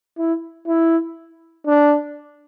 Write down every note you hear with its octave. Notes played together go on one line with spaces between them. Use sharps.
E4
E4
D4